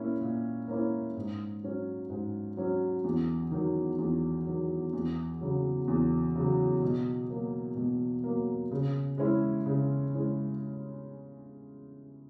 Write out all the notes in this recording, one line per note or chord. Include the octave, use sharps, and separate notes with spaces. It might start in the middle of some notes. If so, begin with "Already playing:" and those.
Already playing: A#2 A#3 C#4 E4
A#2
A#3 C#4 E4
G#2
F#3 C#4
G#2
F#3 C#4
E2
D#3 F#3
E2
D#3 F#3
E2
C#3 F#3
E2
C#3 F#3
B2
F#3 A#3
B2
F#3 A#3
C#3
G#3 C#4 E4
C#3
G#3 C#4 E4